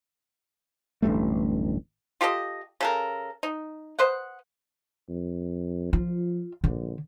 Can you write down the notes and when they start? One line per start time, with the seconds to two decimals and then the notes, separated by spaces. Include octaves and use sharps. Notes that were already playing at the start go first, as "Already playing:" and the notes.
1.02 D1 A1 G2 A3
2.21 F4 G4 A4 D#5
2.81 C#3 A4 A#4
3.43 D#4
3.99 B4 C5 D#5 F#5
5.09 F2
5.93 F3 F4
6.64 A#1 D3